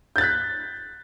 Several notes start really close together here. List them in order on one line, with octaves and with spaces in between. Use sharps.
G6 A6 F#6 B6